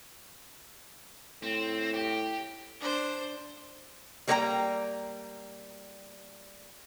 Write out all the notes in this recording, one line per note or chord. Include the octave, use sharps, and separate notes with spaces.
A2 C4
G4
D4 C5
G3 A#3 A#4 C#5 G5 A#5